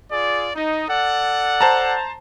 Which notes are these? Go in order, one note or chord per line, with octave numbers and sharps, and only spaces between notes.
F4 G#4 D5
D#4
A4 D5 F#5
C5 A5 A#5